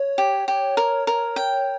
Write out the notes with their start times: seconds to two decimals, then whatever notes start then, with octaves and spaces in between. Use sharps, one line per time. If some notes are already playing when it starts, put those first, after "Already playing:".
Already playing: C#5
0.18 G4
0.48 G4
0.77 A#4
1.07 A#4
1.36 G5